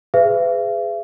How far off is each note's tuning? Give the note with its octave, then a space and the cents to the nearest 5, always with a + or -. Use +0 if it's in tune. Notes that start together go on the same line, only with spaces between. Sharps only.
G#4 +0 B4 +40 E5 +45